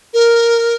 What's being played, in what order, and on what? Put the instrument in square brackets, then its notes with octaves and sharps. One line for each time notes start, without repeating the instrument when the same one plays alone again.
[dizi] A#4